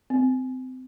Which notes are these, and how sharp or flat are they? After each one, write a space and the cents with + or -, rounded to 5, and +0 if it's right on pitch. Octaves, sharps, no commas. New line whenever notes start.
C4 -25